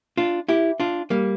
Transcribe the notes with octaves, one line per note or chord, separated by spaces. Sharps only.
D4 F4
E4 G4
D4 F4
G3 A#3